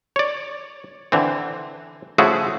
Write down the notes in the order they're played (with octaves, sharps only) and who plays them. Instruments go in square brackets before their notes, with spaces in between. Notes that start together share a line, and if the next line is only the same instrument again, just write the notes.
[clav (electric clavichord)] C#5 D5
D3 E3 C4
C#3 F3 A3 E4 F#4 G#4